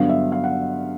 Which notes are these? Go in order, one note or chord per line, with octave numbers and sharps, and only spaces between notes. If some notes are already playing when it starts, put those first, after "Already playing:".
Already playing: G2 D3 F#3 B3 F5
E5
F5
F#5